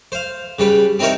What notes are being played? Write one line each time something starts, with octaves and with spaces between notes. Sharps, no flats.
C5 F5
C#3 G3 B4
C4 D#4 E4 A#4 C#5